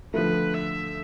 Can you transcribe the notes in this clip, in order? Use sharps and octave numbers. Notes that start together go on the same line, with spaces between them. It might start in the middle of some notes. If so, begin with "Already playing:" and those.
D3 F3 A3 B4
E5